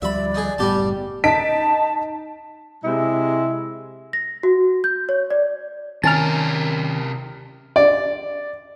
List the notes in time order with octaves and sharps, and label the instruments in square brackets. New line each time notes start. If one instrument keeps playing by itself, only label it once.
[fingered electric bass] D2 F3 G3 [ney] D5 [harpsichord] E5 B5
[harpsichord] D#4 G#4
[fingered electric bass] F#1 A2 B3 [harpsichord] G3 G4 A5
[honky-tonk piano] D#4 B6 D7 [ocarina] A5
[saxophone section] C3 G#3 E4
[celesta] A#6
F#4
G6
C#5
D5
[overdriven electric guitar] C3 A#4 [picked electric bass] D#3 C#4 [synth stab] A5 F6
[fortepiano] D5